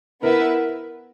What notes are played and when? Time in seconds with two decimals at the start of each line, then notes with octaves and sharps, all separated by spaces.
0.22 B3 E4 A#4 B4 E5